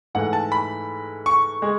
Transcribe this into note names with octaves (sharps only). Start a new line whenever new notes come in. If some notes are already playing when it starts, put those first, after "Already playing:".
G#2 E3 A3 F#5
A5
B5
C#6
G#3